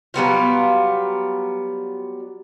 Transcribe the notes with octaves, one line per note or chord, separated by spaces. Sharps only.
F#3 G3 B3 F4